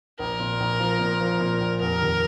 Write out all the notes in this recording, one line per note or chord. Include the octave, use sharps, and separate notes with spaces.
A#1 A#4
A#2
A#1
F3
A#2
F3
A#2
A#1
F1 A#4
D#2